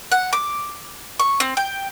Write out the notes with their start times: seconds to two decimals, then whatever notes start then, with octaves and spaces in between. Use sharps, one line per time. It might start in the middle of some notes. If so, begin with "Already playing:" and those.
0.12 F#5
0.33 D6
1.19 C#6
1.40 C4
1.57 G5